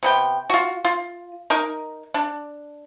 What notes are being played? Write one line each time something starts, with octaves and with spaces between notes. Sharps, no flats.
C3 B3 G5
F4 F#4
F4
D#4 A#4
D4